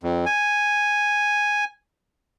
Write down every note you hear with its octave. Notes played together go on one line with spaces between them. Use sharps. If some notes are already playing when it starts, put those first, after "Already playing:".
F2
G#5